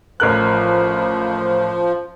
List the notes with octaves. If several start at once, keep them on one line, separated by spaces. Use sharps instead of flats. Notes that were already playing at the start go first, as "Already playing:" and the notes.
A1 F3 A#4 F#6